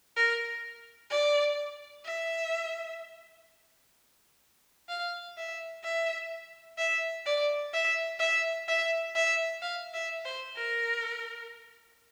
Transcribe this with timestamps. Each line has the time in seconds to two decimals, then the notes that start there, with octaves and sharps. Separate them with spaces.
0.16 A#4
1.10 D5
2.05 E5
4.89 F5
5.37 E5
5.84 E5
6.78 E5
7.26 D5
7.74 E5
8.20 E5
8.68 E5
9.15 E5
9.62 F5
9.94 E5
10.25 C5
10.57 A#4